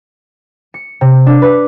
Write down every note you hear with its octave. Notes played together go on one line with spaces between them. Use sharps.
C#7
C3
D4
B4